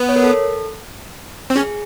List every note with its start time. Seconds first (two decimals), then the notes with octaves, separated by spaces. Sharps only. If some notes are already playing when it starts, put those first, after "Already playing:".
Already playing: B3
0.09 C#5
0.16 A#4
0.24 A4
1.50 C4
1.56 C#4 G#4